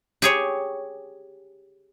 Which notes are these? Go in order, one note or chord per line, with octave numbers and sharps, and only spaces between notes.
G4 G#4 C#5